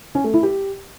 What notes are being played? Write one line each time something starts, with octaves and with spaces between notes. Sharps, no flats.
C#4
A3
E4
G4